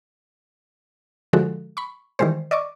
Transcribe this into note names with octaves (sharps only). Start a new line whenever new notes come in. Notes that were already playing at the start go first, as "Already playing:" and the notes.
D3 F3 G#3 F#4 A4
B5 C#6
D#3 E3 G3 G#3 C5
D5 D#5 C#6 D6